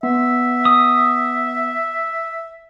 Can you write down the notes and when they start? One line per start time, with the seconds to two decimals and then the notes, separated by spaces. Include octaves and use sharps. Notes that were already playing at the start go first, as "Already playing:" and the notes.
0.03 B3 E5
0.65 D#6